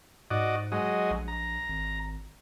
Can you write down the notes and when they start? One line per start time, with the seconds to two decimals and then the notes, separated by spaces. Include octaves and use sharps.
0.31 G#2 F#4 D5 D#5
0.72 F#3 G#3 D#5
1.10 A#1
1.28 A#5
1.69 G#1